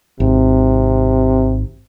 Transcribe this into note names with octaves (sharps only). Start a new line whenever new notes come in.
G#1 C3